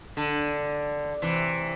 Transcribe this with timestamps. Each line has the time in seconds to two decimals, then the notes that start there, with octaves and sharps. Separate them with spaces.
0.17 D3
1.22 C3 E3